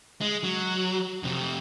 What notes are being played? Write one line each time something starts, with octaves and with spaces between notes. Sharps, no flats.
G#3
F#3
F2 C3